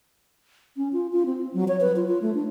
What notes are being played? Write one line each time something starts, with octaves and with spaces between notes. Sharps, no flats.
C#4
F4
F4
C4
F#3
C#5
B4
F4
F4
A3
D4